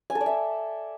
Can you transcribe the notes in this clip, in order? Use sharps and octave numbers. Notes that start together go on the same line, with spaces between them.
G#5
A4
D5
E5